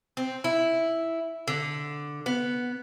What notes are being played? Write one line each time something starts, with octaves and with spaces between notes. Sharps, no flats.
C4
E4
D3
B3